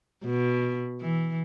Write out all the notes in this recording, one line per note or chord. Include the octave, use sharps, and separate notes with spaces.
B2
E3